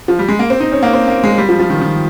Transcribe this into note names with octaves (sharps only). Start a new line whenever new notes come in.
F3
G3
G#3
A#3
C4
D#4
C#4
A#3
C4
A#3
G#3
G3
F3
F3
D#3
D#3